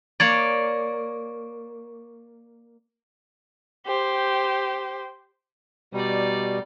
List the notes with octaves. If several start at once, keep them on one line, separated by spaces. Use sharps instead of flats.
A#3 C#5 D5
G4 C5
B2 G3 D#4 D5